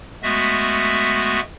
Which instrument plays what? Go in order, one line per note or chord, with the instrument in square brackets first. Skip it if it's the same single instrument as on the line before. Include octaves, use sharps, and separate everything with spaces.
[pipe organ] G#3 A3 B3 F#4 E5